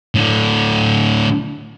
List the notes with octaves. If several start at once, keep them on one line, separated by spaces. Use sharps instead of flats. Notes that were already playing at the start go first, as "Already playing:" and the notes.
A2 D3